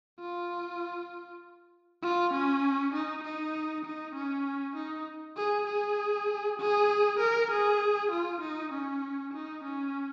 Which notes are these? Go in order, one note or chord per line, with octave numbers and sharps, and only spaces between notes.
F4
F4
C#4
D#4
D#4
D#4
C#4
D#4
G#4
G#4
G#4
A#4
G#4
F4
D#4
C#4
D#4
C#4